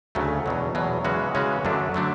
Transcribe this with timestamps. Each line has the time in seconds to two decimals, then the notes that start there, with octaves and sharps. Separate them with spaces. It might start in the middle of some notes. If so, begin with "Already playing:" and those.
0.15 D2 C#3 F#3 A3
0.46 E2 B2 F#3
0.75 E2 B2 F#3
1.04 C#3 E3 G#3 C#4 F#4
1.35 C#3 E3 G#3 C#4 F#4
1.65 F#2 D3 F#3 A3 D4
1.94 D3 F#3 A3 D4